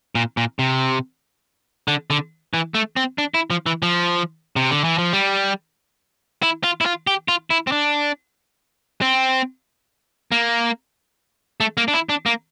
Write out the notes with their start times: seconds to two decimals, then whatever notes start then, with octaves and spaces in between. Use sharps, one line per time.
0.15 A#2
0.37 A#2
0.59 C3
1.88 D3
2.10 D3
2.54 E3
2.74 A3
2.96 C4
3.18 D4
3.34 E4
3.50 F3
3.66 E3
3.83 F3
4.56 C3
4.71 D3
4.84 E3
4.98 F3
5.13 G3
6.43 E4
6.64 F4
6.81 E4
6.86 F4
7.07 G4
7.28 F4
7.50 E4
7.67 C4
7.72 D4
9.02 C4
10.32 A#3
11.60 A3
11.77 A#3
11.88 D4
11.94 E4
12.09 D4
12.26 A#3